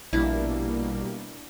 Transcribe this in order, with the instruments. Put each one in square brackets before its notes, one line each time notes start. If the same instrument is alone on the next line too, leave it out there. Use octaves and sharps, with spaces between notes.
[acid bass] A#1 [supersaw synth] B2 G3 A#3 [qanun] D4 E4